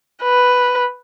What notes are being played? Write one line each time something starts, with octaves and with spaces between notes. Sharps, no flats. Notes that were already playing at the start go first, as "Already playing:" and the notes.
B4